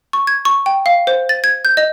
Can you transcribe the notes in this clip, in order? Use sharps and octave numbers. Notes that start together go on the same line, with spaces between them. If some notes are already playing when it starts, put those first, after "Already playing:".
C#6
G#6
C#6
G5
F5
C5
A6
G#6
G6
D#5